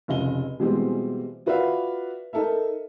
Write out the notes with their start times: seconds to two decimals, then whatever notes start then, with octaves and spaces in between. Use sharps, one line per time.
0.08 F1 C#2 D#5 G7
0.59 B2 E3 G3 G#3 C4
1.46 F4 F#4 B4 D5 E5 F5
2.33 D#4 A4 A#4 E5